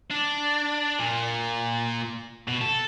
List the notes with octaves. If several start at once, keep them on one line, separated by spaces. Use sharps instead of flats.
D4
A#2
B2
A4